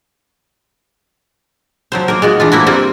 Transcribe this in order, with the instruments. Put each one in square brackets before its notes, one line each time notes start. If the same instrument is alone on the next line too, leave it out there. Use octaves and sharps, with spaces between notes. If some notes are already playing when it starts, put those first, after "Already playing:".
[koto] F3 F#3 C5
A#3 A#4
G#3 F4 F#4
E3 D4 F4
F3 A#3 E4 F#4
G3 C4 F4 A#4